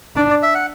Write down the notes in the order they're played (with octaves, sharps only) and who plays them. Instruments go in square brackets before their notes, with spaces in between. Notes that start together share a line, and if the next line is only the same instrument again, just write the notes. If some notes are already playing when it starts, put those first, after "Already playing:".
[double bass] D4 [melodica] D5
[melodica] D5
E5
F#5